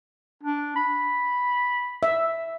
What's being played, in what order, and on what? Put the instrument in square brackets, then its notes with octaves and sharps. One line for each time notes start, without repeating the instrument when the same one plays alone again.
[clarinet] D4
B5
[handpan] E5